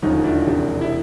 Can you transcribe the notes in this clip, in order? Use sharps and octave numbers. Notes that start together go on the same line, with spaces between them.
E1 D#2 D3 F3 C#4 D#4
D4 E4
E1 E2 C3
E4